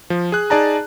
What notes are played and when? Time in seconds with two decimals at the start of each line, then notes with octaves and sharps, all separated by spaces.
0.10 F3
0.32 G#4 F#6
0.50 D#4 G#4 D5 A5 A#5